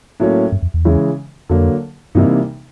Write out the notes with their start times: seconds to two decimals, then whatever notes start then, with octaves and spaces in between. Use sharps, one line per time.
0.20 A2 F#3 A#3 C#4
0.52 G2
0.62 F2
0.74 E2
0.85 C#3 E3 G#3
1.49 F2 D3 F#3 A#3
2.15 G2 C3 E3 G3 A#3 D#4